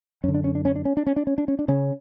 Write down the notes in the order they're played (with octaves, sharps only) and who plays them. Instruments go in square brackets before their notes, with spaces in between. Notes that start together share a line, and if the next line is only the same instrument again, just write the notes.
[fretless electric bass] F#2 D3 C#4
D4
C#4
D4
C#4
D4
C#4
D4
C#4
D4
C#4
D4
C#4
D4
C#3 C#4